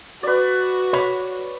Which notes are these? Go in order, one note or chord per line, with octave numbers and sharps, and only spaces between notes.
F#4 B4 D5
C#5 B5